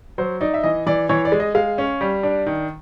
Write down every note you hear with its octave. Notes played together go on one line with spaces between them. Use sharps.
F#3 C5
D#4 D5
E5
E3 D#5
E3 D5
E3 C#5
D5
G#3
D#5
G#3 F5
C#4
G3
D4
D#3